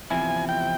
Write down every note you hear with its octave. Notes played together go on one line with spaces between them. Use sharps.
E2 C3 F3 C4 E4 G#5
G5